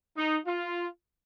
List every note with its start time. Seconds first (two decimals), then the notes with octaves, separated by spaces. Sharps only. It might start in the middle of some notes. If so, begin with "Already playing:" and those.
0.16 D#4
0.46 F4